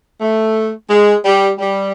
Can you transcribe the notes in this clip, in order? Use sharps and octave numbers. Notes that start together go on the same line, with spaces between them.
A3
G#3
G3
G3